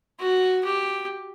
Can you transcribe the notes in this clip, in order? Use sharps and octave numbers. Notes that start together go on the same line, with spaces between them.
F#4
G4